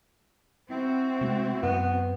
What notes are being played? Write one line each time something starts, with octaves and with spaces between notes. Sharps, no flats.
C4 E4 F#4
C3 G#3 A3
F#2 B3